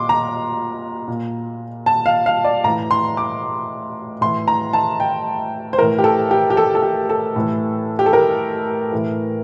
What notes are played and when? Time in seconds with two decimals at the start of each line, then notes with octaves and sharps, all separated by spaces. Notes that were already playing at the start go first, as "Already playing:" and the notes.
Already playing: A#2 C6 D6
0.09 A#5
1.08 A#2
1.86 A5
2.06 F5
2.26 F5
2.45 D5
2.64 A2 E3 A#5
2.91 C6
3.17 D6
4.21 A2 E3 C6
4.48 A#5
4.73 A5
5.00 G5
5.73 C5
5.78 A2 E3 A#4
5.99 G4
6.04 A4
6.31 G4
6.50 G4
6.57 A4
6.75 A4
6.82 G4
7.09 A4
7.36 A2 E3
7.99 G4
8.06 A4
8.13 A#4
8.92 A2 E3